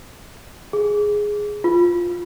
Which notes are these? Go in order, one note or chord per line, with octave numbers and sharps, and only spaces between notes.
G#4
F4